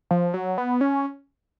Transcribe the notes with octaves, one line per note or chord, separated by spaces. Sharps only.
F3
F#3
B3
C#4